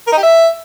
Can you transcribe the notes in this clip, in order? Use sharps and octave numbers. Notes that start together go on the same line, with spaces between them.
A#4
D#4
G4
E5